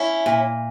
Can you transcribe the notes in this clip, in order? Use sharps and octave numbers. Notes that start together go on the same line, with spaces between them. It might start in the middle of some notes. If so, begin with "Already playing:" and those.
Already playing: C#4 E4
A#2